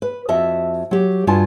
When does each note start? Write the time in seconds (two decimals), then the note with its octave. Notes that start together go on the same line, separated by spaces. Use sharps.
0.02 B4
0.29 F2 F#4 D#5 E5 A5
0.91 F#3 G4
1.27 G2 D4 F4 F#4 G#5 A5